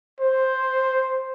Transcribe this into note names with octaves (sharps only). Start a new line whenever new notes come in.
C5